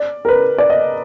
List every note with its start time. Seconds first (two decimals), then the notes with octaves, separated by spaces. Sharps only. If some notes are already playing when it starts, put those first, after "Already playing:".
Already playing: D5
0.25 A#4
0.28 B4
0.58 D5
0.70 D#5